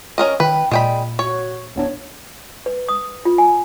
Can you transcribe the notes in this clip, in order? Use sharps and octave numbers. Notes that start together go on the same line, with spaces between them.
C#4 A#4 D#5
D#3 B4 G5
A#2 G#3 D5 G5 B5
F#4 C#5
D1 B3 D4 C#5
B4
D#6
F4
G#5